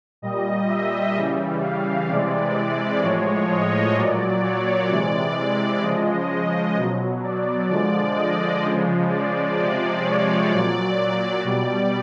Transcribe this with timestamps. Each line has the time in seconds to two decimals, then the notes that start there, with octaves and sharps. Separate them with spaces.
0.22 A#2 G3 D#5
0.69 E5
1.16 C#3 E3 G3
1.62 F5
2.09 C3 E3 G#3 D5
3.02 A2 F3 G#3 C#5
3.50 D#5
3.96 A#2 F#3 D5
4.43 C#5
4.89 C3 E3 G#3 D5
5.83 C#3 F3 G#3 D#5
6.76 B2 F#3
7.23 D5
7.69 D3 F3 G#3 D5
8.16 D#5
8.63 C#3 F3 G#3
9.10 D5
9.57 C3 F3 G#3 D5
10.03 C#5
10.50 A#2 F#3 D5
11.44 B2 G3 D5